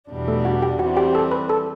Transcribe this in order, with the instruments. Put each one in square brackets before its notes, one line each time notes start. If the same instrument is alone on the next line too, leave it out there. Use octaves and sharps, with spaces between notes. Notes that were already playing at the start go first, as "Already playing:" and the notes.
[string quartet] E2 B2 G3 D4
[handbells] A3 A4
F#4 F#5
G4 G5
[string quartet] E3 G3 C4 [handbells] F#4 F#5
[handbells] G4 G5
A4 A5
B4 B5
A4 A5